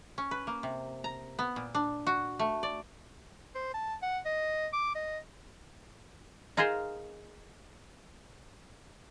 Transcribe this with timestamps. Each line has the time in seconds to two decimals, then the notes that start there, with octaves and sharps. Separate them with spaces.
0.18 C#4
0.31 B4
0.47 A#3
0.63 C3
1.04 A#5
1.39 B3
1.56 A#2
1.75 D4
2.07 F#4
2.39 A3
2.63 D5
3.55 C5
3.74 A5
4.02 F#5
4.25 D#5
4.73 D6
4.95 D#5
6.57 D#4 F4 G#4 A#4 C5